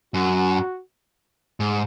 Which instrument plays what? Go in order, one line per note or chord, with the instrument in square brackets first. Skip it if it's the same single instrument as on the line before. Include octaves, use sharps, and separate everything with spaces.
[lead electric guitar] F#2 [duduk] F#4
[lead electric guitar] G#2